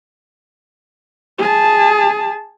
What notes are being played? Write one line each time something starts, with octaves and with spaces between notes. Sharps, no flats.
G#4 A5